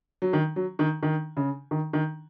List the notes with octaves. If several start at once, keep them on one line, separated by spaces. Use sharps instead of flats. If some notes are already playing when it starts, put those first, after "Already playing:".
F#3
D#3
F#3
D#3
D#3
C#3
D#3
D#3